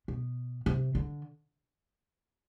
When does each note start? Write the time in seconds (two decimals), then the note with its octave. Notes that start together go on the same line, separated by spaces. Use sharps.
0.08 B2
0.66 C3
0.95 D3